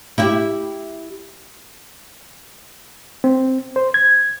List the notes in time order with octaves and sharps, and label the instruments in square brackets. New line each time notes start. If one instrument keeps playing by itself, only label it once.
[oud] E4 G4 E5
[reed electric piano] C4
C5
G#6